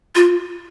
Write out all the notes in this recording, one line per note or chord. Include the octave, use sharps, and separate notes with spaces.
F4